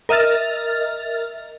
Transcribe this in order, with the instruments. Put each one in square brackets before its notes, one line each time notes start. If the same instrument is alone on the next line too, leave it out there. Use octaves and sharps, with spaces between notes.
[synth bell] A#4 D#5 E5 F6 A6